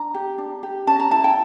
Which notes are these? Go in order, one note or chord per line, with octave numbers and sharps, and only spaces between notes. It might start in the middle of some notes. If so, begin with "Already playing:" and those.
Already playing: D4 A#5
G4
D4
G4
C#4 A5
A#5
E4 A5
G5